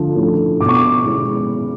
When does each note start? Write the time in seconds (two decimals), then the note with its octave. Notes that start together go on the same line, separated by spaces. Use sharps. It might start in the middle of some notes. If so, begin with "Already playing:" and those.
Already playing: D3 F3 A3
0.16 F3 A3 C#4 E4
0.60 B2 D6
0.69 C#6
0.77 D6
1.05 G#3 C#4 E4